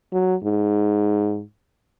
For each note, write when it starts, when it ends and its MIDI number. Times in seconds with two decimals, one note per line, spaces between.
0.12 0.35 54
0.44 1.42 44